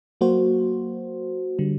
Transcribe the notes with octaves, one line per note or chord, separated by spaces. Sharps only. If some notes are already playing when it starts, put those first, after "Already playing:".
F#3 A#3 F#4 C5
D3 G3